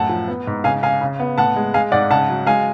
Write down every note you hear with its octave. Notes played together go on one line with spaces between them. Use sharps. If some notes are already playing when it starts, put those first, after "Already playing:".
Already playing: F#2 A2 F#5 A5
F3
B3
G#2
C#3 F5 G#5
C#3 F5 G#5
C#3
B3
A2 F#5 A5
G#3
G#3 F5 G#5
G#2 D5 F#5
C#3 F#5 A5
F#3
G#3 F5 G#5